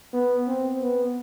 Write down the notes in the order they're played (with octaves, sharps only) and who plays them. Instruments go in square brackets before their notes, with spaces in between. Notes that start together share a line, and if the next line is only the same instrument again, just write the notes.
[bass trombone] B3
C4
B3